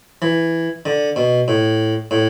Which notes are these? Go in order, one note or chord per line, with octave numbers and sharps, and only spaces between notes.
E3
D3
B2
A2
A2